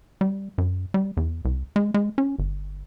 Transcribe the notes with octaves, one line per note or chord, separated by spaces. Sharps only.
G3
F#2
G3
E2
C2
G#3
G#3
C#4
G1